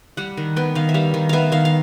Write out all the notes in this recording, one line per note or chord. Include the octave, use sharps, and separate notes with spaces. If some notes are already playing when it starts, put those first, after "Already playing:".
G3 F#5
D#3
B3 G5
D#3 F5
E5
G3 F5
D#3
B3 E5 F5
D#3 F5
F5